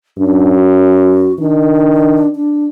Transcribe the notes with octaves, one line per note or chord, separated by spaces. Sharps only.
F#2 D4
F#4
D#3 D4
D4